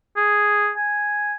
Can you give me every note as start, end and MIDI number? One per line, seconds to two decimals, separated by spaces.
0.17 0.71 68
0.77 1.35 80